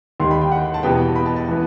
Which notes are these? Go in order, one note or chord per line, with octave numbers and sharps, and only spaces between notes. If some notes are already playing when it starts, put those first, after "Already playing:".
D#2 D#3 G3 C6
B5
G5
F#5
A5
E2 B2 G3 B3 G5
B5
A5
A5
E3 B3